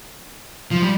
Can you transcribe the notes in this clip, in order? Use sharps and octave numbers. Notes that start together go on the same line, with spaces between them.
F3
G3